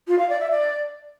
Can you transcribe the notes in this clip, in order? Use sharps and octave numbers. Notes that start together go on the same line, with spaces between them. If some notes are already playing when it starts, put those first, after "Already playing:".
F4
F5
D5
E5
D5